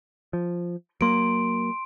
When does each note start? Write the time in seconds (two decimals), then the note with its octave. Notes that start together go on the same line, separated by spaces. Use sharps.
0.33 F3
1.01 F#3 A#3 C6 D7